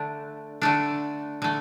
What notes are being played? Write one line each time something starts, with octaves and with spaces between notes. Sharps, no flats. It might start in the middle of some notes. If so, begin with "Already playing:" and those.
Already playing: D3 A3 D4
D3 A3 D4
D3 A3